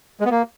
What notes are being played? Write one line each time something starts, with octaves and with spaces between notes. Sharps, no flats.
G#3
B3
A#3